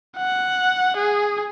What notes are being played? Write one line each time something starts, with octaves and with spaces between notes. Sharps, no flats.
F#5
G#4